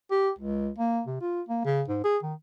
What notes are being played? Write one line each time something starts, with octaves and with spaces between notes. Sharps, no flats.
G4
C#2
A#3
C3
F4
A#3
C#3
G#2
G#4
D#3